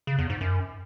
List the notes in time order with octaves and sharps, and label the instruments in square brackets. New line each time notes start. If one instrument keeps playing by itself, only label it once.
[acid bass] C#3
E2
G#2
F#2